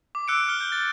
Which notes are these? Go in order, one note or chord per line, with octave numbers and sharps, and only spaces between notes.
D6
E6 F#6 C#7 D7
F6 G7
G6
F#6 A6